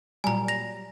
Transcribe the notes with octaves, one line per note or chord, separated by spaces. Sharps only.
A#2 F#3 G3 G#5 A#5
A#6 F7